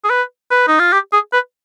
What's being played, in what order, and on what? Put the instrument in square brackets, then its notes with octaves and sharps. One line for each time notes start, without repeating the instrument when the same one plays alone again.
[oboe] G#4
B4
B4
D#4
F4
G4
G#4
B4